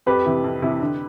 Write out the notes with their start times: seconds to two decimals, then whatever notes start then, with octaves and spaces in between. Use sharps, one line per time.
0.06 F2 G4 B4
0.26 C3 E3
0.44 F2
0.62 C3 E3
0.80 D3